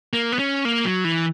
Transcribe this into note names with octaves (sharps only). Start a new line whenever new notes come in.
A#3
B3
C#4
A#3
F#3
E3